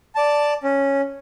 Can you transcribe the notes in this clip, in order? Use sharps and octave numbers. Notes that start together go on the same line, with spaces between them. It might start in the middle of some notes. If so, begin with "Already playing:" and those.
D5 A5
C#4